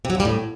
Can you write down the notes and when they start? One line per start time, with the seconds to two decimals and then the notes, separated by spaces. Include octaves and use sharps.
0.05 C3
0.10 F#3
0.15 A#2
0.20 G3
0.25 A2